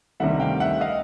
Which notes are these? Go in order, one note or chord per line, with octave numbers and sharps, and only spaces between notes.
D2 C3 D#3 G3 E5 F#5
F5 G5
E5 F#5
D#5 F5